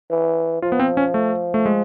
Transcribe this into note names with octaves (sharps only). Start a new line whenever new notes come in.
E3
F3 F4
B3
C4
C#4
A3
A3
G#3